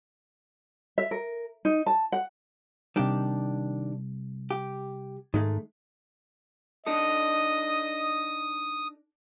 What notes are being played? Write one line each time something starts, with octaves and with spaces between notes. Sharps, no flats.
E5
A#4
D#4
A5
F#5
C3 D#3 G3 D4 G4
G4
G#2 D#3 G#3 A3
D4 D#4 A4 D#5 D#6